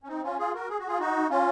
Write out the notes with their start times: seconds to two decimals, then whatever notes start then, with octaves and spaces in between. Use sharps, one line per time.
0.03 C#4
0.08 C4 D#4
0.23 C#4 F4
0.38 F4 G#4
0.54 F#4 A#4
0.69 G#4
0.79 F#4
0.87 F4 G#4
0.99 D#4 F#4
1.30 C#4 F4